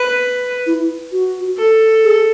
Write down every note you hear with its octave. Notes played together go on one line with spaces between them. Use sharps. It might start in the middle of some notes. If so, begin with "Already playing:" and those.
Already playing: B4
E4
F#4
A4
G#4